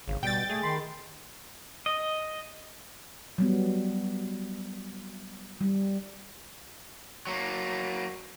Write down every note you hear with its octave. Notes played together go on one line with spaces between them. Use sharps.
G#1 C#3
B2 G3 G5 A6
A3 G#4
D#3 B5 C6
D#5
F#3 G3 B3
G3
F#3 A#3